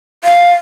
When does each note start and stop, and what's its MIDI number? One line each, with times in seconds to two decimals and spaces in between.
0.24 0.52 77